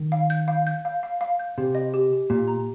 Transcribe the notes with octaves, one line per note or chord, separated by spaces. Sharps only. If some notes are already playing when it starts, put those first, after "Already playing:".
Already playing: D#3
F5
G6
F5
G6
F5
F5
F5
G6
C3 G4
D#5
G4
G4
A#2 G4
A#5